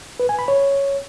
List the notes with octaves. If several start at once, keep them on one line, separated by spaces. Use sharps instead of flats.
B4
G#5
B5
C#5